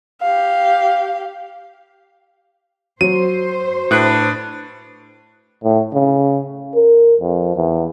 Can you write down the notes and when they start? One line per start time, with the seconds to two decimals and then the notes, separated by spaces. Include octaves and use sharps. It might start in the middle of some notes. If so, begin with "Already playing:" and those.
0.22 G4 F5
3.01 F#3 C5 D#7
3.91 A2 D4 B4 F#6
5.64 A2
5.93 C#3
6.75 A#4
7.21 F2
7.56 E2